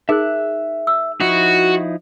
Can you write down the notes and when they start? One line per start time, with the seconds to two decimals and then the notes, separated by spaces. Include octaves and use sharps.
0.09 D#4 G#4 A#4 E5 F#6
0.87 E6
1.20 F3 D#4 E4 F#4